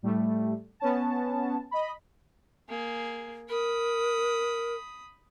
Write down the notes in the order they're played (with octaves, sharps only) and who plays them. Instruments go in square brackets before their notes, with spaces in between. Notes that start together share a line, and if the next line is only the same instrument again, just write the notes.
[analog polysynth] A2 G3 A3
B3 C#4 A5
D#5 B5
[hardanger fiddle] A#3 G#4
[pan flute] A#4 [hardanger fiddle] B5 D#6